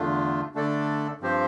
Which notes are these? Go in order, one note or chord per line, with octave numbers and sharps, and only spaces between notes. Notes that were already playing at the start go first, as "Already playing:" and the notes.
Already playing: E2 D3 A3 D4 F4
D3 A3 D4 A4 D5
G2 F3 C4 G4 C5